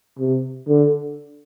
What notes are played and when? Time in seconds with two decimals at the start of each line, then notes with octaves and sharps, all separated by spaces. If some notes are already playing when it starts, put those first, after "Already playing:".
0.19 C3
0.68 D3